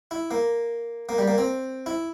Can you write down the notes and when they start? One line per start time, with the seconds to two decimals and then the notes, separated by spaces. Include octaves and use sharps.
0.11 E4
0.31 A#3
1.09 A#3
1.18 G3
1.28 A#3
1.38 C4
1.86 E4